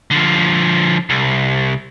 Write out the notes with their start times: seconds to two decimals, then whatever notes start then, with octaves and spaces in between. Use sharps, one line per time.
0.11 D3 F3
1.10 C2